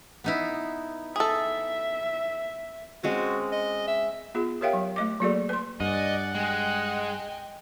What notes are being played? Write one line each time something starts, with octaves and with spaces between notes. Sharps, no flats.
B3 D#4 E4
G#4 A4 E5
G#3 C4 C#4 F#4
D#5
E5
B3 F4 G#4
G4 A#4 C#5 E5 F5 G5
F#3
A3 D#5 D6
F#3 A#3 F#4 G#4 A4 D5
B4 C6
G2 D5 D#5 F#5 G#5
G#3 D#5 G5 G#5